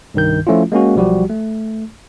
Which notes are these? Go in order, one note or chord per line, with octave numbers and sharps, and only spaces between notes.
C2 G2 D#3 G6
F3 A3 C#4 E4 F4
G#3 A#3 C#4 F#4
B1 F3 G3 F#4 G4
A3